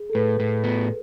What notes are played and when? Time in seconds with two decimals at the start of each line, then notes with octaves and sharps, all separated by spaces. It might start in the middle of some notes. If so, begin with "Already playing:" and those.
Already playing: G#4
0.10 A4
0.15 A2 B4
0.40 A2
0.64 B3